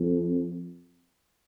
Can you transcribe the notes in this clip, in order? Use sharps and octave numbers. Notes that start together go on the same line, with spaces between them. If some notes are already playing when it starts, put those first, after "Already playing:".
Already playing: F2